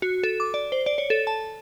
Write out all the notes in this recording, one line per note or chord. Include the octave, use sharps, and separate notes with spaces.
F#4
A4
D6
D5
C5
D5
C#5
A4
A5